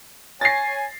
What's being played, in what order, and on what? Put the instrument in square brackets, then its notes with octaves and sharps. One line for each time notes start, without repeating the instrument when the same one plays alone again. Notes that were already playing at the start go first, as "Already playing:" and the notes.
[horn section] C#5 G#5 [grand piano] A6 A#6 C7